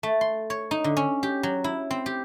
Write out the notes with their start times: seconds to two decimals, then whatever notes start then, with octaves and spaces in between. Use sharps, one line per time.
0.03 A3
0.21 C6
0.50 C#5
0.71 D#4
0.84 D3
0.97 C#4
1.23 G4
1.43 F#3
1.64 E4
1.91 C4
2.06 G4